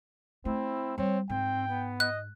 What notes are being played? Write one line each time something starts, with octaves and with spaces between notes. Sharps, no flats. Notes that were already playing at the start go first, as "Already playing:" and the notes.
A3 C4 E4
G3 C4 C#5
G#2 C4 G5
B3
D#5 F#6